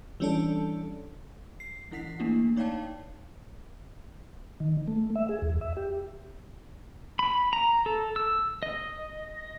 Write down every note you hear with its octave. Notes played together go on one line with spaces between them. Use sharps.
E3 G3 C#4 D4 A4
C7
E3 E4 F#5 B6 C7
A3 A#3 D4 E4
D#4 C#5 D5 F5 G5 A5
D#3
A3
E5
G#4
E2
E5
G4
B5
A#5
A4
E6
D#5